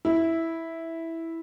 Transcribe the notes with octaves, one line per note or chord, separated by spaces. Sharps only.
E4